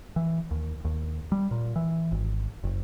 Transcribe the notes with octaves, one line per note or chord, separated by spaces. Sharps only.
E3
D#2
D#2
G3
A#2
E3
G#1
F#1